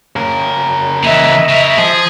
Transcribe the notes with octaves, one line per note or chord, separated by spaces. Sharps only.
C#3 A#4
A#2 E3 D#5 E5
C#3 A#4
F3 G#4